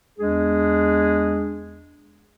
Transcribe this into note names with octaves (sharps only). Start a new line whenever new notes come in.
E2 G#3 D4 G#4